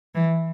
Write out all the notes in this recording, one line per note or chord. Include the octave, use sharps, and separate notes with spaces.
E3